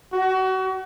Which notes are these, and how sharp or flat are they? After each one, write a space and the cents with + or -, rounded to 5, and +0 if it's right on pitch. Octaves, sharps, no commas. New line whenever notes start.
F#4 +30